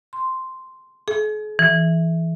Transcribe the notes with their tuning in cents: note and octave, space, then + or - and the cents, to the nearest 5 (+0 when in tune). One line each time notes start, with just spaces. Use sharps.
C6 -5
G#4 +45
E3 +5